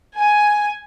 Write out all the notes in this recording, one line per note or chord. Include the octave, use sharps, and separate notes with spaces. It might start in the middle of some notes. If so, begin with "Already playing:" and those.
G#5